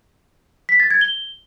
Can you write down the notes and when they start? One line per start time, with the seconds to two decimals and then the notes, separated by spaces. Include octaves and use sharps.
0.69 B6
0.80 A6
0.91 G#6
1.01 G7